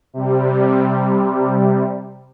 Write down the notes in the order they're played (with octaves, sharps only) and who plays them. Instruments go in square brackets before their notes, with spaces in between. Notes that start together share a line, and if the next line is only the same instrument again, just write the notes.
[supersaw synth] C3 G3